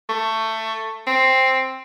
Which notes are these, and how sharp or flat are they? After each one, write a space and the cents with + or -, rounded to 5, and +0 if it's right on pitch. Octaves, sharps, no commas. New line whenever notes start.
A3 +15
C4 +5